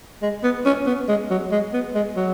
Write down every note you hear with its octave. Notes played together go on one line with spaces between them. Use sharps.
G#3
B3
C#4
B3
G#3
F#3
G#3
B3
G#3
F#3